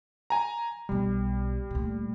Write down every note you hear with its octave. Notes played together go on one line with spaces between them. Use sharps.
G#5 A#5
B1 G3 B3
D2 A#2